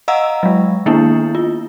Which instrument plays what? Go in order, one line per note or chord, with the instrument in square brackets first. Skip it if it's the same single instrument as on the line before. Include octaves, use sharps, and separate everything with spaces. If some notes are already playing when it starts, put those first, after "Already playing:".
[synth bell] D#5 F5 F#5 A#5 E6
F#3 G#3
D#3 A#3 B3 D4 E4
F4